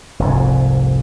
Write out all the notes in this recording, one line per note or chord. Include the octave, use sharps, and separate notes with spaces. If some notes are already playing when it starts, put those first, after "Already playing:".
F1 C2 G#2